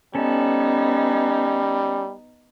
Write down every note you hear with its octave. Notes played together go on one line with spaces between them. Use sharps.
G3 B3 C#4 D#4 A4